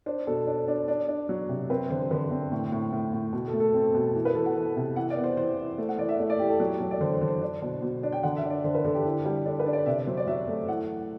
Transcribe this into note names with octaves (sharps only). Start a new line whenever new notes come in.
D4 C5
B2 A4
D4
D4
D4
D4
F#3
C3
C4 B4
D3 C5
D3 B4
C4
A2
A2
A2
A2
B2
A4
A3
A4
C4
B2
E3
B4
E3 A4
F#5
E3
C3
E3 F#5
D5
B3
C5
E3 C5
E3
A3
F#5
E3 D5
E5
A3 D5
D5
E3 G4
A4
F#3 G4
F#3 A4
D5
D3 C5
C5
D3
C5
D4
B2
B2
D4
G5
D3 F#5
E5
D4
D5
D3 C5
B4
D3 A4
G4
E3
G3
D4 A4
B4
D4
D5
C3 E5
D5
F#3 C5
D5
F#3 E5
A3
E3 F#5